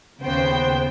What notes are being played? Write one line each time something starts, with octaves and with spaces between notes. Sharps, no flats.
D#2 C#3 B3 C5 G5